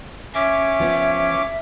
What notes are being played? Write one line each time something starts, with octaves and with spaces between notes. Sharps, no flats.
C#4 E5 D6
F3 B3 F4